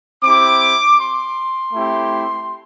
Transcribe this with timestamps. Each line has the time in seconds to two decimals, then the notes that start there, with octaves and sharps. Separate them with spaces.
0.22 C4 E4 G4 D6
0.98 C6
1.74 A3 C4 E4 G4